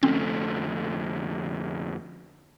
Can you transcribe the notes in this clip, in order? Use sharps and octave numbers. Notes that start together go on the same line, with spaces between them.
F2 D3 A3 C4 C#4